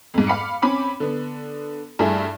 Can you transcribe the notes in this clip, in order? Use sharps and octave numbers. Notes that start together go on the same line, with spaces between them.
F2 G#2
F5 B5 D6 C#7
C4 C#4 B5 D6
D3 B3
G2 A3 E4 G#4 E5